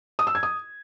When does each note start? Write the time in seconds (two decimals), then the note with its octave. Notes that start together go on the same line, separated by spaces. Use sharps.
0.19 D#6
0.27 E6
0.35 G#6
0.43 D#6